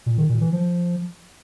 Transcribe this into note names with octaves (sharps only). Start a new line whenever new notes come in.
A#2
D#3
A#2
E3
F3